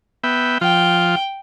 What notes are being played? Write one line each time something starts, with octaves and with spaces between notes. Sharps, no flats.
B3 E5 G5
F3 F4 G5